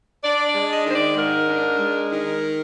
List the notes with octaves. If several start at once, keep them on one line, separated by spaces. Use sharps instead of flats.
D4 D5
D5
G#3
D#5
D#3 C5
D5
G#2 A#4
D4
G#3
D#3 A#4